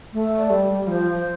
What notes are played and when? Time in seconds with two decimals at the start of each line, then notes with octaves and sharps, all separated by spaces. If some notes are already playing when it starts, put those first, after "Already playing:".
0.13 A3
0.38 D5
0.50 G3
0.87 F3 C5